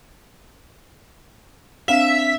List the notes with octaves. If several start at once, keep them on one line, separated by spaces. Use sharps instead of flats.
C4 D4 E5 F5